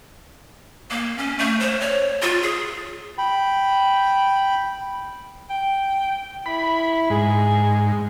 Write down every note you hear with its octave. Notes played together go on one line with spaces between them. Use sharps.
A#3
C#4
A3
C5
C#5
F4
G#4
G5 B5
G5
E4 B5
G#2 G#4